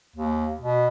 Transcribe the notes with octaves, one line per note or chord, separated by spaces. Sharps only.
D#2
B2